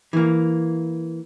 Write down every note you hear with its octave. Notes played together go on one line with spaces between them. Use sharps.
E3 A#3